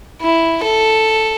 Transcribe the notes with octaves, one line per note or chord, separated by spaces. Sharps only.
E4
A4